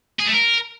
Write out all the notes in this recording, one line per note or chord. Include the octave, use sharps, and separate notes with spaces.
G#4
A3
A#4